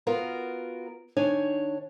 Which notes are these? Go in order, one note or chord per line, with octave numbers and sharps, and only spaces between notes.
B3 F4 F#4 A#4
D#3 D4 C#5 G#5